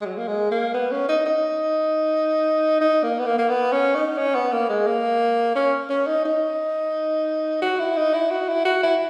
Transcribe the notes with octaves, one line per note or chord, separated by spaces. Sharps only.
G#3
F#3
A#3
G#3
A#3
B3
C#4
D#4
D#4
D#4
A#3
B3
A#3
A#3
B3
C#4
D#4
C#4
B3
A#3
G#3
A#3
C#4
C#4
D#4
D#4
F#4
E4
D#4
E4
F#4
E4
F#4
E4